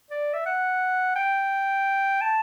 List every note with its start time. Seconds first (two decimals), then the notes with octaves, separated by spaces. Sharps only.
0.11 D5
0.34 E5
0.46 F#5
1.16 G5
2.21 A5